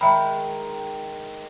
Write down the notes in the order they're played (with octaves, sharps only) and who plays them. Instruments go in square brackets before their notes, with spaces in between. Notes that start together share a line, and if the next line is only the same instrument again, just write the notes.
[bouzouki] D#3 F#3 G#3 [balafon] E5 B5